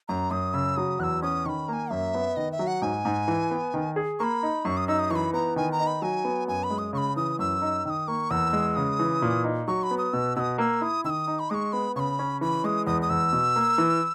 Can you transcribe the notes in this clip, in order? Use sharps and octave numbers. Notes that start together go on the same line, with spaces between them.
F#2 A#5
F#2 D#6
C#3 E6
F#3 D#6
E2 E6 F#6
C#4 D#6
D#3 B5 C#6
A#3 G#5 A#5
F#2 E5
B3
D#3 D#5
E5
F#3
F#5
G#2 G#5
G#2
E3
B3
D#3
G#4
A#3 B5 C#6
D#4
F#2 C#6
D#6
D#4 E6
D#6
E3 B5 C#6
B3 A#5
D#3 G#5
A#5
D#4
B5
F#3 G#5
B3
F#2 G#5
B5
G#3
D#6
C#3 B5 C#6
E3 D#6
F#2 E6
D#4
D#3 D#6 E6
A#3 C#6
E2 E6
G#3
C#3 D#6
E3
A#2
D#4
F#3 C#6
B5
B3
D#6
B2 E6
B2 D#6 E6
A#3 E6
E4 D#6
D#3 E6
D#6
D#4
B5
G#3 C#6 D#6
B3 B5
C#3 B5 C#6
C#4
E3 B5
G#3 D#6
E2 D#6
D#6
E2 E6
B2
A#3
E3